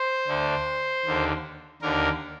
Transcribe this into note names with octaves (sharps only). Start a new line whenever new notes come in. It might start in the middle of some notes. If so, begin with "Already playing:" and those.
Already playing: C5
D2 D3
D#2 D3
D#2 D3 A#4